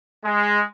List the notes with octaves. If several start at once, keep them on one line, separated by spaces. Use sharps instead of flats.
G#3